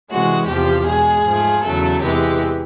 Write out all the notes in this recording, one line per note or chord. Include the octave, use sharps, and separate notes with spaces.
C3 E3 G#3 F#4
E2 C3 F3 G4
B2 G#3 G#4
G#2 F3 A3
E2 C#3 F#3 A3 A4
E2 C3 E3 G#3 G4